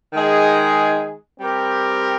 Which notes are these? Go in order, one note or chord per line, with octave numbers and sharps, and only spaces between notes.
D#3 G#3 D#4 G#4
G3 C4 G4 A#4